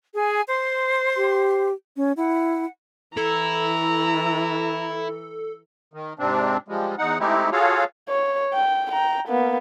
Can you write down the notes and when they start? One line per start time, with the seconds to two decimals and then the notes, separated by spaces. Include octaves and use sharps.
0.14 G#4 G#5
0.48 C5 C6
1.17 G4
1.97 C#4
2.17 E4 F#5
3.17 E3 E4 A4 A#5
5.94 D#3
6.19 G#2 C3 C4 D4
6.68 F3 G3 G#3
6.98 E2 D#4 F#5
7.20 G#3 A3 C4 D#4 E4 G4
7.52 F4 F#4 G#4 A4 C#5 F5
8.08 C#5
8.54 G5
8.92 G5 A#5
9.28 A#3 B3